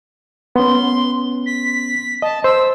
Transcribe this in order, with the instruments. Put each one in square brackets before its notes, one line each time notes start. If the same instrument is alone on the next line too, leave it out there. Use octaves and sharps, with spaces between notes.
[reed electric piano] B3 C#4 [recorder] C6
[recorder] B6
[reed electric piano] D#5 [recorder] A5
[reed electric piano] C5 [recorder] E6